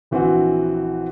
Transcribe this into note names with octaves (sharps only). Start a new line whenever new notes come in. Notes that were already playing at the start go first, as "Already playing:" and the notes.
A#1 E3 C4 F#4